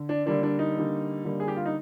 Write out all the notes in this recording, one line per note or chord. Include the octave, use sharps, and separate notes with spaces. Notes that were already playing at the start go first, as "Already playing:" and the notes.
Already playing: D3
D4
D3 G3 A#3 D4
D4
D#4
D3 G3 A#3
D3 G3 A#3
G#4
G4
F4
D#4